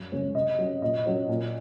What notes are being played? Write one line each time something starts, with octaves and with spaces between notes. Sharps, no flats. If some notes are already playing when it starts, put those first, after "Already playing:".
Already playing: F#2
C#3 G#3 C#4
C3 D#5
F#3 C#4
A#2 D#5
F#3 C#4
A#2